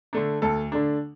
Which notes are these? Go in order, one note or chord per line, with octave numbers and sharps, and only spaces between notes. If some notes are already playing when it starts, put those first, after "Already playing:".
D3 A3 D4
D2 A4
D3 A3 D4